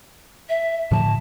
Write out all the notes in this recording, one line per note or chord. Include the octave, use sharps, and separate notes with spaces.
E5
A2 D3 F3 A5